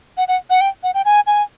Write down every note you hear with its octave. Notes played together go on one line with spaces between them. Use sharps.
F#5
F#5
F#5
G5
F#5
G5
G#5
G#5